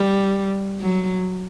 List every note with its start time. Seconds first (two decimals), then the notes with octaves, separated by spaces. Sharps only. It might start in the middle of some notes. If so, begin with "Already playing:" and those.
Already playing: G3
0.81 F#3